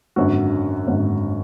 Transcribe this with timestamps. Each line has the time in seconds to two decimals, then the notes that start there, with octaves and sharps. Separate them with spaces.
0.16 G#1 F#2 D3 F#4
0.86 G#1 F#2 D3